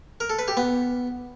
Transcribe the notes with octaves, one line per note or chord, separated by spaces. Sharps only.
A#4
A4
B4
G4
B3